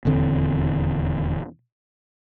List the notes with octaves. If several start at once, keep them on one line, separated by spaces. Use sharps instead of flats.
D#1 E2 D3 C4